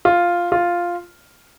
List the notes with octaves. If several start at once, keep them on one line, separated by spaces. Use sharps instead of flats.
F4
F4